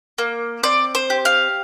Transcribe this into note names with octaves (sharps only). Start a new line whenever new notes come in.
A#3
C4 D5
C5
G4
F5